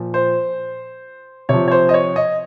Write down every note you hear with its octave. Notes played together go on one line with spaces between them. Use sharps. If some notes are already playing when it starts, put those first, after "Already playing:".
Already playing: A#2 F3
C5
C3 F3 C#5
C#5
C5
D#5
C#5
D#5